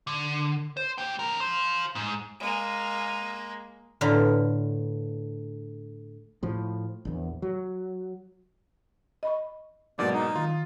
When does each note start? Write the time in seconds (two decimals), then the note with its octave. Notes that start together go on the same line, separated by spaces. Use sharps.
0.07 D3
0.77 C5
0.98 A#3 G5
1.19 F2 A#4
1.40 F4 C5
1.95 G#2
2.40 G#3 A#3
4.01 A2 D3 F4 B4 E5 A#5
6.43 A2 F3
7.05 A#1 E2
7.42 F#3
9.23 D#5 B5 C#6
9.99 G#2 B2 F#3 A#3 D5
10.14 D#4
10.36 D#3 F4